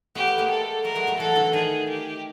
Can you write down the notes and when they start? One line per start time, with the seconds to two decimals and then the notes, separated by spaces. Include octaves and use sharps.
0.15 A3 B3 G4
0.27 A3 B3
0.38 G#3 A#3
0.50 A4
0.84 G3 A3 A#4
0.95 F#3 G#3
1.07 G3 A3
1.19 E3 F#3 A4
1.36 D3 E3
1.53 D#3 G#4
1.89 G4